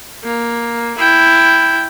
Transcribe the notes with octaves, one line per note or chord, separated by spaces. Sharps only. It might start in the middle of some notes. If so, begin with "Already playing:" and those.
A#3
E4 G5